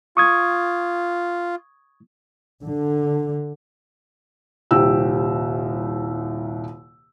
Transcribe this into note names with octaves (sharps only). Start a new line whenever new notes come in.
F4 C#6 D#6 G#6
D3
D#1 C2 G4 E6